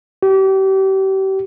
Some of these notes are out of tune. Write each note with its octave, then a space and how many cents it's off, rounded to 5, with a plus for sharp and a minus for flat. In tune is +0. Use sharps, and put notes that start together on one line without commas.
G4 -35